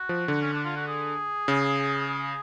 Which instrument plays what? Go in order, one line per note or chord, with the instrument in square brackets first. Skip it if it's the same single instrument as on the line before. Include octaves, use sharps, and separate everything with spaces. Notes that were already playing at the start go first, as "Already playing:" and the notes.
Already playing: [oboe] F#4
[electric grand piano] F3
D3
[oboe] C#4
D4
F4
F#4
G#4
[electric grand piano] C#3
[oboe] G#4